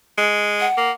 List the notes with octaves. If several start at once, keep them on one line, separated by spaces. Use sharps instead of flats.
G#3
F#5
A#3